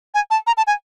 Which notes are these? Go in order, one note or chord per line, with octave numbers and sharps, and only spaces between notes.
G#5
A5
A#5
A5
G#5